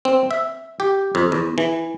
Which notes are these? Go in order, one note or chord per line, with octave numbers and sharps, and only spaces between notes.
C4
E5
G4
F2
E2
E3